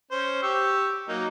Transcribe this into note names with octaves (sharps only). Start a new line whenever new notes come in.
C#4 C5
G4 C#6 E6
F#3 A#3 D#4